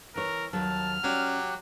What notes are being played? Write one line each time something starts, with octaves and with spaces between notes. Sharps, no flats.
E3 A#4 C#5
D#2 F#3 A5 F6
F#3 C#4 G4 D5 F#6